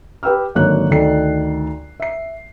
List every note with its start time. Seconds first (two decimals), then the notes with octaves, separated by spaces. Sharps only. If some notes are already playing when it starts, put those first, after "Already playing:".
0.23 G4 B4 G5 E6 F6
0.55 G#1 D3 F#3 A#3 C#5 F#6
0.91 D2 D#3 A4 D5 C7
2.00 E5 C7